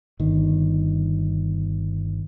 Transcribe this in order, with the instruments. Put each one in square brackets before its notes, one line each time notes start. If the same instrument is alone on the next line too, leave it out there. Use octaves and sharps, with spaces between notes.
[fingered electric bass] G1 D#3